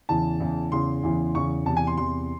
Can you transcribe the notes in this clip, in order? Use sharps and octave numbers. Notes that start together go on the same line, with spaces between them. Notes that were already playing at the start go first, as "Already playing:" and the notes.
E2 C#3 E3 A5
E2 C#3 E3
E2 C#3 E3 C6
E2 C#3 E3
E2 C#3 E3 C#6
E2 C3 E3 A5
G#5
C6
E2 C3 E3 C6